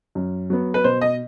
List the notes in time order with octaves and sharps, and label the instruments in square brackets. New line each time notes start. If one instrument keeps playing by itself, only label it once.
[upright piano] F#2
F#3 B3
B4
B2 C5
D#5